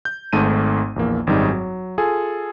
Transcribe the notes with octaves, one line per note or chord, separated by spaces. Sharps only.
G6
G#1 G#2 A3 A5 D#7
A#1 E2 A#3
G#1 F#2 F#3 G3 D#4 G#4
F#3
F4 G#4 A4 G#5